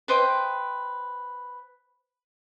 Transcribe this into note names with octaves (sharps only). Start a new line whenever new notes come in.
B4 C5 D#5 G5